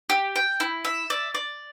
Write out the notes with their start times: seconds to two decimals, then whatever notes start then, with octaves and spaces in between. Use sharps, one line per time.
0.10 G4
0.36 G5
0.60 E4
0.85 E5
1.10 D5
1.35 D5